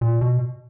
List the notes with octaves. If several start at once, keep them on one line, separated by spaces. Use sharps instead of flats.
A#2
B2